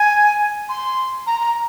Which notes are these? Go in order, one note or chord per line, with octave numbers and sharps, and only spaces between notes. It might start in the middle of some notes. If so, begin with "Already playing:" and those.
Already playing: G#5
C6
A#5
A#5